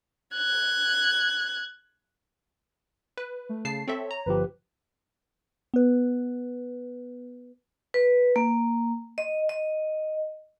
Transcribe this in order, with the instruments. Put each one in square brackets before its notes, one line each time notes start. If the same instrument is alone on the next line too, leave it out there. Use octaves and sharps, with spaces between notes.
[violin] F#6 G#6
[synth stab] B4
[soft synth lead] A3
[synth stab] C#3 A5 C7
[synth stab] C4 A4 E5 [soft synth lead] C#5
[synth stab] A#5
[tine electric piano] G1 F3 G4 [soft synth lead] B4
[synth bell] B3 B4
[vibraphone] B4
A#3
D#5
D#5